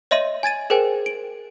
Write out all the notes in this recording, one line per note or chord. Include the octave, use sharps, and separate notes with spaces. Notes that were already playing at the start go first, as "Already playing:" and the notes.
C#5 D#5 E5 C6 D#7
G#5 G#6 A6 D#7
G#4 A#4 C5 G5 G#5
D7